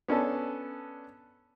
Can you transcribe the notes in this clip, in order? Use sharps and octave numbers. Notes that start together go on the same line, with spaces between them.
B3 C#4 D4 A4